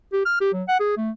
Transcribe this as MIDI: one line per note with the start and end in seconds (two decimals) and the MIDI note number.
0.13 0.21 67
0.26 0.38 89
0.41 0.52 67
0.53 0.63 54
0.68 0.77 78
0.80 0.97 68
0.97 1.10 57